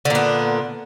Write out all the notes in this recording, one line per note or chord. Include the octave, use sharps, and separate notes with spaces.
A#2 D3 B3